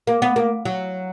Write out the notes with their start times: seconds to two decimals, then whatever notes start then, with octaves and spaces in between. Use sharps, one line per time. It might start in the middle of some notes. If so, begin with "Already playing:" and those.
0.07 A#3
0.22 B3
0.36 A#3
0.65 F#3